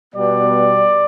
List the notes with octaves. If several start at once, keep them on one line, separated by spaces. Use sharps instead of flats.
B2 G3 B3 D5